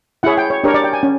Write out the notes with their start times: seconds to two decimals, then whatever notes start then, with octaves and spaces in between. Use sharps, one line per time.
0.23 E4 G#4 C#5 F#5
0.38 G5
0.50 C#5
0.64 D4 G4 A#4 C#5
0.74 D5
0.84 G5
0.93 G#5
1.03 C#4